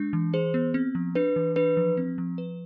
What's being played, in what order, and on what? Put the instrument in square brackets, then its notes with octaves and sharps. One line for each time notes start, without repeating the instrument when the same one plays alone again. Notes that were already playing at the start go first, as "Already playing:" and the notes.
Already playing: [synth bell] G#3 D4
E3
[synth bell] G#4 [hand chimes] C5
[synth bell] B3
C4
F3
[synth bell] D4 [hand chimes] B4
[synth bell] E3
[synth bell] D4 [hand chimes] B4
[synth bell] F3
C4
F3
B4